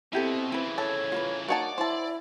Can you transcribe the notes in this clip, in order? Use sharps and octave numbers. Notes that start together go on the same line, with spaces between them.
B2 C4 E4 G4 A4
C#3 E3 E4 B4
A4 C#5
F4 A#4 B4
A#3 D#4 F#4 C#5 D5 A5
E4 C5 A5